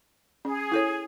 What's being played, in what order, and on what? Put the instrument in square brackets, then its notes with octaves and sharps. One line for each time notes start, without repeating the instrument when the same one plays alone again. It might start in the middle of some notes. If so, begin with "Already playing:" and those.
[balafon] C#4 [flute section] G#4
[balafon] E4 A4 C#5